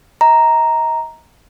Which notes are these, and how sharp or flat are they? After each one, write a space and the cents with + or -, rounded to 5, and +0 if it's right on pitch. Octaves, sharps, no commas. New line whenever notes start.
D#5 +35 A#5 +0